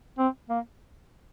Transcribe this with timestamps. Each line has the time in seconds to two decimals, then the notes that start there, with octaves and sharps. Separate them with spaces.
0.18 C4
0.50 A#3